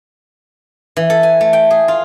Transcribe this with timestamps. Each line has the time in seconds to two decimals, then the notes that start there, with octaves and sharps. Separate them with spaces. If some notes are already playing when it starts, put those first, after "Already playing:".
0.97 E3
1.10 A4
1.23 G#5
1.41 A3
1.53 G5
1.70 G#4
1.88 F4